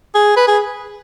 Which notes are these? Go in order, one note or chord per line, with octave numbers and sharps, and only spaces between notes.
G#4
B4
G#4